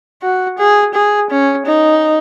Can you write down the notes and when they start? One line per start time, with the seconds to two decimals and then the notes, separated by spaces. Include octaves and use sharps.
0.22 F#4
0.59 G#4
0.94 G#4
1.30 C#4
1.66 D#4